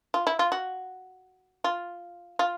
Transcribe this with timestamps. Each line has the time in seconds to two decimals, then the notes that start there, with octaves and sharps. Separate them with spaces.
0.14 F4
0.27 E4
0.39 F4
0.52 F#4
1.64 F4
2.39 F4